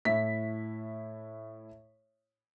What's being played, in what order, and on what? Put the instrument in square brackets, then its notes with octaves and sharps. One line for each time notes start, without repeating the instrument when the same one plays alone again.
[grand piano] A2 E4 B6